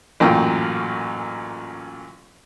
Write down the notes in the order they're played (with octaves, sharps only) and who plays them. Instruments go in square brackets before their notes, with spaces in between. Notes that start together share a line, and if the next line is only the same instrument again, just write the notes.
[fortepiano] A1 F#2 A#2 F4 G5